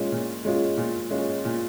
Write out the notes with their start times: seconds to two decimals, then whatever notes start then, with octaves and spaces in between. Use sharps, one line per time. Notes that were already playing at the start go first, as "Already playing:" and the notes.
Already playing: A#2 G#3 C#4 F4
0.12 A#2
0.45 G#3 C#4 F4
0.77 A#2
1.11 G#3 C#4 F4
1.45 A#2